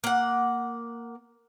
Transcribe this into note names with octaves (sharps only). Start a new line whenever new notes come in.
A#3 F#5